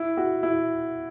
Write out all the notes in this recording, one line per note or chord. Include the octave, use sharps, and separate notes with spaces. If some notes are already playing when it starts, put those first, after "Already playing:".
Already playing: E4
F#4
E4